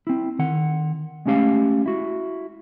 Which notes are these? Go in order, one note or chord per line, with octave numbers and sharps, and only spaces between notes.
C4 E4
D#3 F#5
G#3 A3 C#4 G4 F5
E4 F#4